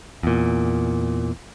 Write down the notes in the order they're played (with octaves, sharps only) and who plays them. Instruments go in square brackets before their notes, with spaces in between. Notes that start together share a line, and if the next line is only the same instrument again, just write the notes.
[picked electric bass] E2 A#2